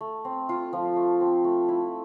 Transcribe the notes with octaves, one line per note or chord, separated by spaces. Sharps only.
A3
C4
F4
F3
A3
C4
A3
E4